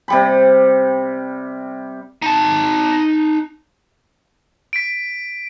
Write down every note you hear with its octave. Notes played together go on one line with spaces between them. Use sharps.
C3 G3 B5
D#4 A5
B6 D7